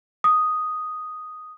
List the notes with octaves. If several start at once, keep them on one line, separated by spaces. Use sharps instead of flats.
D#6